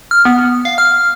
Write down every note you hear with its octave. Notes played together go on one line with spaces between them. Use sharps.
F6
B3
F5
F6